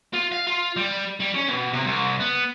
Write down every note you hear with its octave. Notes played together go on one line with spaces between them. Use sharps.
F4
F5
F4
G3
G3
C#4
B2
C3
C2
B3